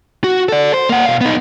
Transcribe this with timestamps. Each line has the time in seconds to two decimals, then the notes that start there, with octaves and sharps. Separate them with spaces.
0.24 F#4
0.49 A4 D5
0.73 C5
0.89 A#3 F#5
1.06 B2 F5
1.21 B3 D#4